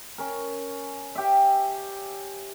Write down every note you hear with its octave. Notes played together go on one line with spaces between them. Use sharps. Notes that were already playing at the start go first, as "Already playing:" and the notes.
C#4 A#4
G4 E5